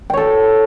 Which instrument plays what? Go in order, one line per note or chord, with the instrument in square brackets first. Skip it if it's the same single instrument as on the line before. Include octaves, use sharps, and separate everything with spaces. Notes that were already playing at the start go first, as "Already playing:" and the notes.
[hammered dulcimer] G5
C#5
A4